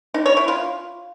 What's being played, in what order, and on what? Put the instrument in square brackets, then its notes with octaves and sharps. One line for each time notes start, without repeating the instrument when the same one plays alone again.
[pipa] D#4
C#5
E4
F4